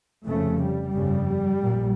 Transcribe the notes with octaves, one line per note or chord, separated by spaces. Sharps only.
F1 F2 C#3 A3
G3
G1 F2 C#3
A#1 A#2